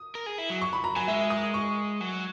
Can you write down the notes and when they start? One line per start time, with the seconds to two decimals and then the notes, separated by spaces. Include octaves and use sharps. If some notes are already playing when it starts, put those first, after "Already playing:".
Already playing: D#6
0.15 A#4
0.26 G#4
0.38 E4
0.50 F#3
0.61 C#6
0.73 B5
0.84 A#5
0.96 F#3 G#5
1.08 G#3 E5
1.30 D#6
1.54 C#6
2.01 F#3